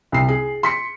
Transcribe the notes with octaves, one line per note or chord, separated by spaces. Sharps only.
C2 C7
G#4
C6 B6 C#7